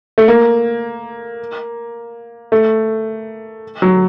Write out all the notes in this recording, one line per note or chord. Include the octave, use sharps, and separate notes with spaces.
A3
A#3
A3
F#3